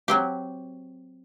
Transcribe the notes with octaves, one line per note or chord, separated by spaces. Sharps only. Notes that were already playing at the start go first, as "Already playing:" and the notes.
F#3 C4 G4